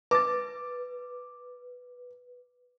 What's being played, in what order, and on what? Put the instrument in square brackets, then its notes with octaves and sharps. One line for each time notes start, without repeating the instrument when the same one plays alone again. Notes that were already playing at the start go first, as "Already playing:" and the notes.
[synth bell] B4 [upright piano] D6 A6